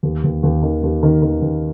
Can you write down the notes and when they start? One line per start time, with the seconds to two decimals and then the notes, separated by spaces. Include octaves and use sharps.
0.03 D#2
0.24 D#2
0.43 D#2
0.62 D#3
0.83 D#2
1.03 D#3
1.22 D#3
1.42 D#2